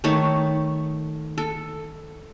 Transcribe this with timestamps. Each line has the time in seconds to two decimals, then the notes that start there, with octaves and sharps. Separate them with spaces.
0.04 D#3 A3 C#5 A5
1.38 A4